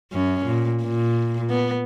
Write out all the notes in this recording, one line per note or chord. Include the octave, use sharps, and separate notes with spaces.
F#2 C#4
A#2
A#2
B3